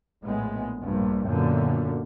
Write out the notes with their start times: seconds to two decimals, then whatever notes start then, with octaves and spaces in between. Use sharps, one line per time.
0.24 A#1 A2 G#3 B3
0.82 A#1 G2
1.26 F#2 A#2 D3 B3